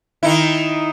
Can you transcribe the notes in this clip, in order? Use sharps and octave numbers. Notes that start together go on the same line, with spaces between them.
D#3 D#4 E4